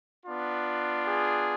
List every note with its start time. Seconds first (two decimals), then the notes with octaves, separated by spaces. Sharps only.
0.25 B3 D4 F4
1.06 G#4